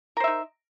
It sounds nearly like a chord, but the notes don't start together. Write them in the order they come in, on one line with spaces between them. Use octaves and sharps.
A#4 C5 E5 D#4